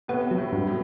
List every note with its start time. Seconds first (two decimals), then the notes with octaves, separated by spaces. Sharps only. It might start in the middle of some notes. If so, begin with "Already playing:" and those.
0.08 A2 C3 B3
0.31 F#3
0.38 A2 C3
0.53 G2
0.67 B2